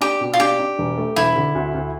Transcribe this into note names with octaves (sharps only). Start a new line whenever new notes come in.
D4 G4
B2
F4
D4 G4
D4
E1
A3
E1 E4
D3
D2
D2